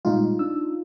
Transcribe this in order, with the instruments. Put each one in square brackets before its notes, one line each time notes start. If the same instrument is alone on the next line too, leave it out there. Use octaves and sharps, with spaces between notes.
[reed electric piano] A#2 G3 G#3 [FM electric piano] D#4 F4
[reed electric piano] D4 E6